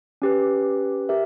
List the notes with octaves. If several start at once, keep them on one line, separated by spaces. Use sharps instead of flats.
C#4 G4 B4
G4 A#4 E5